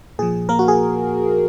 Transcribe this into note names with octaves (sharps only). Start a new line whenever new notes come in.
A#2 F3 G#4
A#3 A#4
F#4
G#4